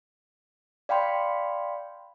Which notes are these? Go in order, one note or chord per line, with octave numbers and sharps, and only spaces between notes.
D5 F5 G5 B5 C6